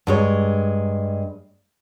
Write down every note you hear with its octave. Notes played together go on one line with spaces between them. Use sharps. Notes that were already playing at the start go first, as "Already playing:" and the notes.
G2 G#3 C#5